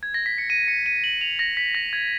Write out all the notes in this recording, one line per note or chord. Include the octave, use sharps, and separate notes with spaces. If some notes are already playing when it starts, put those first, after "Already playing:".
G#6
A#6
B6
C#7
D#7
C#7
D#7
F#7
F7
A#6
B6
A#6
G#6